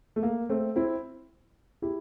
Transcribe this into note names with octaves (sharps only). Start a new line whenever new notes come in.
A3
A#3
A3 C4
C4 E4
E4 G4